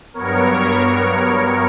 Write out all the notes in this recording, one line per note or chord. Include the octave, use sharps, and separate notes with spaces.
G2 F#3 B3 A#4 C#5